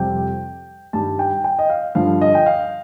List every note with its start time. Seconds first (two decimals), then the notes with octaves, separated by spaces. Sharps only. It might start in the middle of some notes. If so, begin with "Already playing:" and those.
Already playing: F2 C3 G3 G5
0.93 G2 D#3 G3 A5
1.19 G5
1.44 G5
1.59 D#5
1.70 F5
1.95 G2 D3 F3 F5
2.21 D#5
2.35 G5
2.46 F5